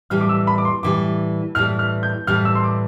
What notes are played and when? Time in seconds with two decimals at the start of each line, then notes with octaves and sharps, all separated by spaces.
0.10 A2 E3 G3 F6
0.21 D6
0.29 E6
0.47 B5
0.58 D6
0.65 C6
0.83 A2 E3 G3 D6
1.55 A2 E3 G3 F6
1.79 F6
2.03 G6
2.27 A2 E3 G3 F6
2.45 E6
2.55 C6
2.64 D6